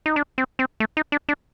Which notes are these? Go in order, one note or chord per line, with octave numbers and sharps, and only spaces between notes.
D#4
D4
C4
C4
A3
D#4
D4
D4